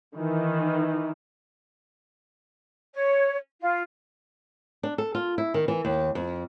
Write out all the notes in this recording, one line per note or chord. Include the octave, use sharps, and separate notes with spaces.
D#3 E3
C#5
F4
D4
A4
F4
E4
D#3
E3
D#2
F2